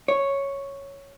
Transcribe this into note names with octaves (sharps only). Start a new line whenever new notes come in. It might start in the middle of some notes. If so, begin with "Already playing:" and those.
C#5